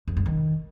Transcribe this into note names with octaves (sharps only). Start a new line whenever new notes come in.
F2
G2
D#3